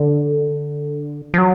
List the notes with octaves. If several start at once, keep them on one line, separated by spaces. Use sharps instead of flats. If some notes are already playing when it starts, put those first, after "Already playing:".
Already playing: D3
F3
F#3